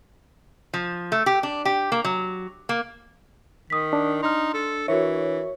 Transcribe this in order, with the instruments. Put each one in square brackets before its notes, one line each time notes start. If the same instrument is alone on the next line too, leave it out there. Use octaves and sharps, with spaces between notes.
[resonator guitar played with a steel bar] F3
A3
G4
D4
G4
A#3
F#3
A#3
[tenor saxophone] D#3 [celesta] D#6 B6
[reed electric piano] D4
[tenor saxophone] D#4 [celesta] C6 F6
[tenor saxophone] A4
[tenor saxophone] E3 [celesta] F#4 A#4 E5 [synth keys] C#5